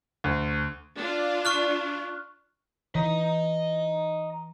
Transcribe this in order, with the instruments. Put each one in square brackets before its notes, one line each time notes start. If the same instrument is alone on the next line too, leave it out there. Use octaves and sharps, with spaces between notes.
[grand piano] D2
[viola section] D4 F4
[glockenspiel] C#6 F6 F#6
[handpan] E3 [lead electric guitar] D#5 A#5